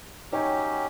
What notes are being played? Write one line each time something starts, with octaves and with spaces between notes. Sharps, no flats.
F#3 C#4 D#4 G4 C#5 G5